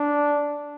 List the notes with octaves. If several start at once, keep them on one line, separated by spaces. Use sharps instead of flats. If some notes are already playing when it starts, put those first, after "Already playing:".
Already playing: D4